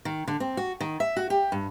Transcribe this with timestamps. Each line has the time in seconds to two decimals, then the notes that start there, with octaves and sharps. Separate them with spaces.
0.05 D#3
0.27 D3
0.40 C4
0.57 F#4
0.80 D#3
1.00 E5
1.17 F#4
1.30 G4
1.52 G2